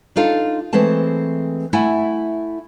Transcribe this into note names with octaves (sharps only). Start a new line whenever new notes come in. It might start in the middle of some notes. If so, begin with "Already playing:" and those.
D4 D#4 F4 A4
E3 G#3 A3 C4 A5
A3 E4 E5 F#5 G#5